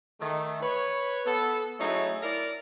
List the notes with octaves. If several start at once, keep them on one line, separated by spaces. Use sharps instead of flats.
D#3 A3
B4 C#5
B3 A4
F#3 A3 C#4 D#4 E4 G#4
E4 A#4 D5